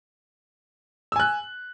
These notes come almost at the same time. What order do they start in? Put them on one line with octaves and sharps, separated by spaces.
E6 G#5 F#6